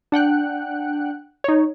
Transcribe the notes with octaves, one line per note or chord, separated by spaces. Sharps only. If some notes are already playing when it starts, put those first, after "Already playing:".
D4 F#5 G5 F#6
D#4 C#5